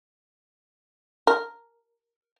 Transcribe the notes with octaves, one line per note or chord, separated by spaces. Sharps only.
A#4